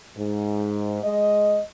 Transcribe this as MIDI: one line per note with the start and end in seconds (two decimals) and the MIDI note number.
0.17 1.03 44
1.04 1.61 56
1.04 1.61 75